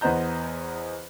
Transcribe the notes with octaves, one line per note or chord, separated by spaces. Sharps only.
E2 B3 C5 D#5 A#5 G6